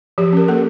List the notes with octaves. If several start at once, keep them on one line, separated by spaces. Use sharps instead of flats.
F3 G4
C#4 A#4
A#3 A4